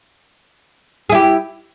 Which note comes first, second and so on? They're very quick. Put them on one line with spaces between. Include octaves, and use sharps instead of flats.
G#4 E4 G4